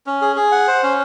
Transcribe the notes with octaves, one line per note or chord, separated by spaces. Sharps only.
C#4
G#4
G#4
F#5
C5
C#4